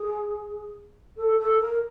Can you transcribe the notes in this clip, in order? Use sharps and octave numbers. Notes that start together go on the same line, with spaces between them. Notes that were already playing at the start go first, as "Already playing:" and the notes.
Already playing: G#4
A4
A4
A#4